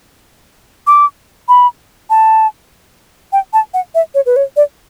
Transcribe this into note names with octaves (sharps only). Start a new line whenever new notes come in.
D6
B5
A5
G5
A5
F#5
E5
C#5
B4
C#5
D5